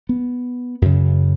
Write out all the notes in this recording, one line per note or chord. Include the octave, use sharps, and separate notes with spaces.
B3
F#2 C#3